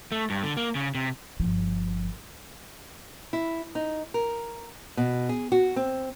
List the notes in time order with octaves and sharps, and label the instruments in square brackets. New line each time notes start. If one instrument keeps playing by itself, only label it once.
[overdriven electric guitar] A3
G2
D3
A#3
C#3
C3
[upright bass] G1 F3
[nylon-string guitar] E4
D#4
A#4
B2
G#4
F#4
C4